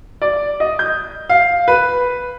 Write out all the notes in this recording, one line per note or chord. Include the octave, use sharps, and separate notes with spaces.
D5
D#5
G6
F5
B4